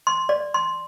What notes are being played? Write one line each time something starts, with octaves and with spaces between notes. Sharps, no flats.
C6
D5
C6